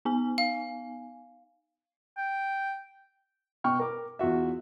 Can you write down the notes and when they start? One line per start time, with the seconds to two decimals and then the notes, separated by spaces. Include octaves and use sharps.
0.05 B3 D#4 G#5
0.38 F5
2.17 G5
3.64 B2 G5 C#6 F6
3.80 A#4 D6
4.19 E2 F4 F#4 E5